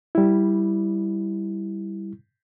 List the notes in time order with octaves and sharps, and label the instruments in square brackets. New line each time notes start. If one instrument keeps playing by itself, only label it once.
[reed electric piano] G3 E4